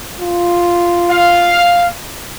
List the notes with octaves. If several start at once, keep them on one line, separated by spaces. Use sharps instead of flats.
F4
F5